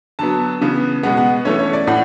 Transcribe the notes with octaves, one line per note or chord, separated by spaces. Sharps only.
D3 F#3 B3 A5
C#3 E3 B3
B2 G#3 B3 F#5
F#5
E3 A3 C#4 C#5
C#5
D5
A2 F#5